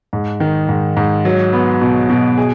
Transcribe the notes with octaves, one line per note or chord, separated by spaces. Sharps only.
G#2
D#3
G#2
G#2
F#3
B3
B2
B2
G#4